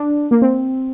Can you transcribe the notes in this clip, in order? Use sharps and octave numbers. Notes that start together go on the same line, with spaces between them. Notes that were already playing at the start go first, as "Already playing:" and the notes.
Already playing: D4
A#3
C4